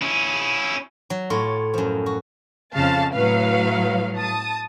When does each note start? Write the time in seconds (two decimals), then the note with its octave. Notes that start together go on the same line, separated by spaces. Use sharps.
0.02 C#4 E4
1.10 F#3
1.30 A2 F4 C#5
1.74 F#2 F3
2.06 F#4
2.75 F2 C#3 F5 A5
3.13 A2 F#3 B4 F5
4.16 A5 D#6